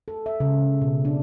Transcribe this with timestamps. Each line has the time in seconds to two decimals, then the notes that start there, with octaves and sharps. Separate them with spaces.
0.08 A4
0.26 E5
0.40 C#3
0.82 B2
1.05 D4